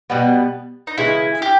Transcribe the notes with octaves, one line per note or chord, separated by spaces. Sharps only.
B2 G3 B3
D#4
C#3 E3 G#3 E4
G4